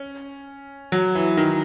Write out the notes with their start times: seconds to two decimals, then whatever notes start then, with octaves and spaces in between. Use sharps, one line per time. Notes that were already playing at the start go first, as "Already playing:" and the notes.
Already playing: C#4
0.92 F#3
1.15 E3
1.37 D#3